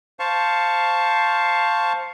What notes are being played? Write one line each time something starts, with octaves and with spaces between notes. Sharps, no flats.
C5 F5 A5 C#6